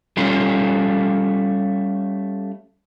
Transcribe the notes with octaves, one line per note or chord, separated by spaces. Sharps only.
G3 A3 C#4 F4